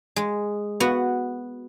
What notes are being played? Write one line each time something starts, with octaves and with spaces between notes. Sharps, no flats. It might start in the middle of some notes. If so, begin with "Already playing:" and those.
G#3
B3 F#4